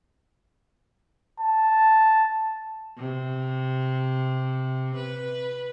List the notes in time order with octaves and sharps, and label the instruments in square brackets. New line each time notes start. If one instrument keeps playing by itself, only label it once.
[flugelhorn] A5
[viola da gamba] C3
B4